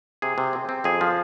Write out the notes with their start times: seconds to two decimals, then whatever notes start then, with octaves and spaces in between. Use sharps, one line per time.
0.22 C3 G#4
0.38 C3
0.53 C4
0.69 C4
0.84 F2 G#4
1.01 F3